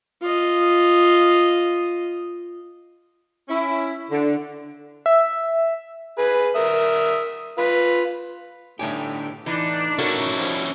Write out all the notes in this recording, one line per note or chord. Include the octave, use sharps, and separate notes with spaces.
F4 D#5
C#4 E4
D3
E5
G#4 B4
A#4 E5 D#6
F4 B4 B5
A2 D3 A3 D#4 G4 C#5 G#5
A2 E3 D4 D#4
C#4 E4 F#4 A4 A#4
B2 F3 G3